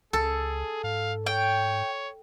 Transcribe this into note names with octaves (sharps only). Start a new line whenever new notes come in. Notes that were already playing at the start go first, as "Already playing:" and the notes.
C#2 G#4 A4
G#2 F5
C#5 G5